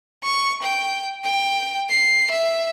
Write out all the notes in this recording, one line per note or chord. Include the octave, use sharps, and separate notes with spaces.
C#6
G5
G5
C7
E5